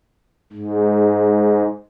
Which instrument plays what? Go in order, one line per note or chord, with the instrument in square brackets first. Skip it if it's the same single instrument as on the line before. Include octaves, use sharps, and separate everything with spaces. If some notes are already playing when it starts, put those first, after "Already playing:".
[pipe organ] G#2